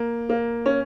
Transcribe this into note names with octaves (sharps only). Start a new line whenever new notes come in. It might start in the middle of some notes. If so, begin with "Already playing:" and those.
Already playing: A#3
A#3
C#4